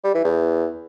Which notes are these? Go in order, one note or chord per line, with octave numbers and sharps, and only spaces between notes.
G3
E3
E2